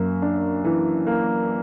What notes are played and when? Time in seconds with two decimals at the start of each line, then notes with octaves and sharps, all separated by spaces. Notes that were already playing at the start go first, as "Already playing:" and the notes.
Already playing: F#2 A#3
0.22 D4
0.64 E3
1.07 A#3